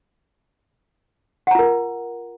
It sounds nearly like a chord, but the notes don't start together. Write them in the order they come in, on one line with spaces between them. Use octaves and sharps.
F#5 A#5 F4 A#4